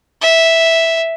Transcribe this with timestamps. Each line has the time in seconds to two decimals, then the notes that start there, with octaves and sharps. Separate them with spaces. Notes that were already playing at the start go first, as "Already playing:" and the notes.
0.21 E5